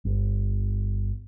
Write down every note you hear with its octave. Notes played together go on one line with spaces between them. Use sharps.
G1